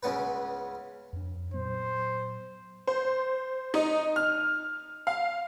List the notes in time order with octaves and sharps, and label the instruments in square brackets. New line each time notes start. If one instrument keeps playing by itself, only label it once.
[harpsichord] C#2 C#3 B3 B4
[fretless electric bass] F2 D4
[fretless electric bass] A#2 F#3 B3 [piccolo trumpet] C5
[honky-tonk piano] C5
D#4
F6
F5